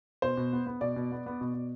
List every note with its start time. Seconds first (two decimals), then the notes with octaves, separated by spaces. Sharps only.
0.22 B2 C5
0.37 B2
0.53 B3
0.66 B3
0.81 B2 D5
0.96 B2
1.11 B3
1.26 B3
1.41 B2
1.55 B2